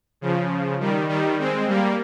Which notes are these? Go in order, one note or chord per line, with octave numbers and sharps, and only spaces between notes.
C#3 F3
D#3 G3
D#3 G3
G#3 C4
G3 A#3